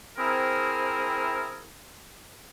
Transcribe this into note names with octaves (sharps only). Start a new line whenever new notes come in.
C4 E4 G#4 A#4